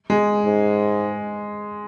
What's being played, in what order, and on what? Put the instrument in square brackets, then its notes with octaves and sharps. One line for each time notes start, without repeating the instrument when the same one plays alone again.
[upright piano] G#3
[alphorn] G#2